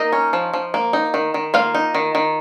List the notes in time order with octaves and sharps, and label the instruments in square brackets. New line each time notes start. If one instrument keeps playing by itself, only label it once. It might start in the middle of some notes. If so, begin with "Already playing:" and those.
Already playing: [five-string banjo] A#3 D#4 D#5
C#4
F3
F3
A#3
D#4
D#3
D#3
A#3 F4 F5
D#4
D#3
D#3